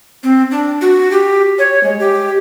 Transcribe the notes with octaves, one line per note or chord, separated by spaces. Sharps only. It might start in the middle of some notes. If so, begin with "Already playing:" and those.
C4
D4
F#4
G4
C#5
G#3
G4